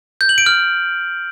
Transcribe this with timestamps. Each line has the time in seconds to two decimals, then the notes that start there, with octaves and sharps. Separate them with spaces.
0.21 G6
0.29 F#7
0.38 D7
0.46 F6